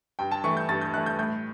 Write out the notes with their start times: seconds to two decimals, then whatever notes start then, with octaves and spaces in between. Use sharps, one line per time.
0.19 G2 G5
0.31 A5
0.44 E3 A3 C#6
0.57 G6
0.69 G2 A6
0.81 G6
0.94 E3 A3 F#6
1.06 G6
1.19 A2 G6